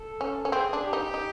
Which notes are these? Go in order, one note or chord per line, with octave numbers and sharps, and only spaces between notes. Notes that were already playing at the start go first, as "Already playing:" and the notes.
Already playing: A4
C#4
C#4
C4 G#4
D4
G4
D#4
D#4